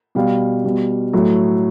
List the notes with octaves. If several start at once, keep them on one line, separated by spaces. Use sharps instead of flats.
B2 G3 F5
B2 G3
A2 F#3 A3